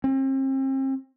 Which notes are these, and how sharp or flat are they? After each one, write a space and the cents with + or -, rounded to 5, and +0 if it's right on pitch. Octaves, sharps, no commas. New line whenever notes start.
C4 +40